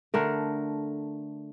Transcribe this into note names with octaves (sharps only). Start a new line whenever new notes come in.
D3 A3 A#4